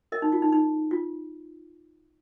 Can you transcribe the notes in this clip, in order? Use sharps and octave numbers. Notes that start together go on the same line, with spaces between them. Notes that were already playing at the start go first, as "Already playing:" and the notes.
A#4 D#5
D#4
F4
D#4
D#4
F4